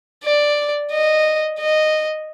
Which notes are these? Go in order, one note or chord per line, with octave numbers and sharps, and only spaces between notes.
D5
D#5
D#5